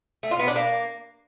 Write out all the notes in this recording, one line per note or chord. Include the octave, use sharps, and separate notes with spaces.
A3
F4
B3
D4
A#3